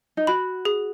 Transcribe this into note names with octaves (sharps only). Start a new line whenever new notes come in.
D#4
F#4 B5
G#4